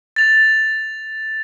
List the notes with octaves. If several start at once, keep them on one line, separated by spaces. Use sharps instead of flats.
A6 F7